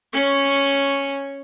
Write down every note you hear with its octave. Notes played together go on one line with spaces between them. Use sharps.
C#4 C#6